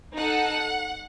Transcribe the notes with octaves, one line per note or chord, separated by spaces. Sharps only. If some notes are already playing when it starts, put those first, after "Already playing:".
D#4 A4 F#5